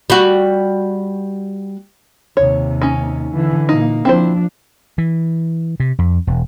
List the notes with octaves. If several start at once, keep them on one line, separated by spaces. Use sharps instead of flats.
G3 F#4
D#2 C3 C#5
C#4 D#4
D3 E3
A#2 A#3 D#4
F3 C4 D4 E4 C5
E3
C3
F2
E1